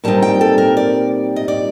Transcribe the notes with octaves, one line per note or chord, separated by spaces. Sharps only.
A#2 G3 C4 D#4 A5
G5
A4
A#4
D5
D#5
D5